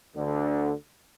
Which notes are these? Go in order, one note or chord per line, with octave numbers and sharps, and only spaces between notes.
D2 D3